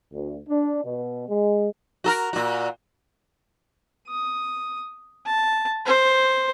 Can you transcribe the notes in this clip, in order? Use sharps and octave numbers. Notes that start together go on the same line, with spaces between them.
D2
D4
B2
G#3
F#4 A4 A#4
A#2 F#4
D#6
A5
C5